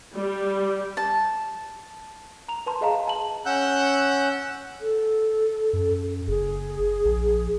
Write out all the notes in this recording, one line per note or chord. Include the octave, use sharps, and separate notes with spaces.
G3
A5
A#5 F7
B4 A5 C6
G#4 D#5 F5 A#5
A5 F#7
C#4 F#5 E6 F#6 G6
A4
F#2
F#1 G#4
A#1